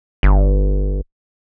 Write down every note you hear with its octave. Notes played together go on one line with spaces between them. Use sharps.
G1